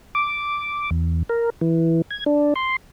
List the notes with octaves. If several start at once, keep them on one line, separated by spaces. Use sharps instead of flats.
D6
E2
A#4
E3
G#6
D4
C6